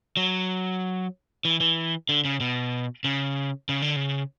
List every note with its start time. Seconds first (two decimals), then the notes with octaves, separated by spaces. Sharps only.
0.17 F#3
1.45 E3
1.60 E3
2.09 D3
2.25 C#3
2.40 B2
3.04 C#3
3.69 C#3
3.82 D3
3.96 C#3